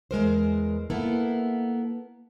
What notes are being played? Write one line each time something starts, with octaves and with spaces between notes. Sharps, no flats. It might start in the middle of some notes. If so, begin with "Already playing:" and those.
E2 G#3 A#4 C5
A#3 B3 E4 A4